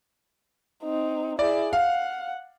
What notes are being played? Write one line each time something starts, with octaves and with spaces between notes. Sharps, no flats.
C4 D#4
E4 G#4 D5
F5 F#5